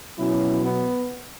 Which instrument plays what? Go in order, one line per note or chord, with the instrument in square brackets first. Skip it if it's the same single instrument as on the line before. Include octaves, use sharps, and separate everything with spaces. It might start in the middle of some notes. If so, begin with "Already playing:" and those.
[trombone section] B2 F#3 C#4 E4
B3